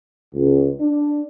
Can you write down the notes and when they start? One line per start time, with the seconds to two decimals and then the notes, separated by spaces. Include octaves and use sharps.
0.35 C#2
0.80 D4